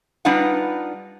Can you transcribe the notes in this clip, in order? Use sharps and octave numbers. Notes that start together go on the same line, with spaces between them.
G3 D4 D#4 F4 B4 F#5